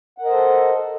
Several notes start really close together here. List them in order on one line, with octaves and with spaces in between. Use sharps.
F#5 A#4 D#5 C5 A4